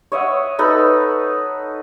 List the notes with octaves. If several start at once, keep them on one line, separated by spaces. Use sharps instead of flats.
C#5 D#5 E5 F#5
D#4 A4 B4